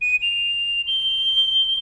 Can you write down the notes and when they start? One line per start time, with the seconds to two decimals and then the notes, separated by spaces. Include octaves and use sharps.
0.01 D#7
0.22 F7
0.87 G7